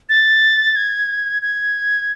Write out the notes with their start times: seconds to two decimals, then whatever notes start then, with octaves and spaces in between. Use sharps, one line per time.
0.09 A6
0.76 G#6
1.42 G#6